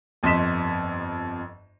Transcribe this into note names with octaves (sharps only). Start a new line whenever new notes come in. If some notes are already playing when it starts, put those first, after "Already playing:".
G1 F2 D#5 C6 B6 E7